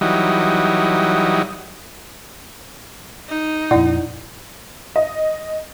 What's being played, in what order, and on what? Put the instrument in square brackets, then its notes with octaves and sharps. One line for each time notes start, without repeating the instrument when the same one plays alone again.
[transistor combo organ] E3 F#3 G3 D#4
[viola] D#4
[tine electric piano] F2 A#2 [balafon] E4 D5 F#5
[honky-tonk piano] D#5